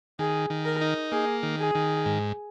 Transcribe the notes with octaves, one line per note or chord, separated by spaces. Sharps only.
D#3 G#4
D#3
A#4
D#4
A#3 G#4
D#3
G#4
D#3
G#2